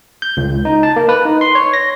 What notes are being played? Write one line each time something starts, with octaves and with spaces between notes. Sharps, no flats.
G6
C#2
D#4
A5
A#3
B4
D#4
C6
C#5
A#6